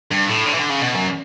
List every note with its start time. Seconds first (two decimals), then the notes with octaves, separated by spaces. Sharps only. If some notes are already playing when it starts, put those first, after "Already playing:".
0.12 G2
0.28 A2
0.47 D3
0.54 E3
0.59 D3
0.70 C#3
0.82 B2
0.95 F#2